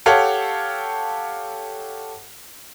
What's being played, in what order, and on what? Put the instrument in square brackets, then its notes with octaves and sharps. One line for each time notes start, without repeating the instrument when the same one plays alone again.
[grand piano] G4 A4 C#5 F5 F#5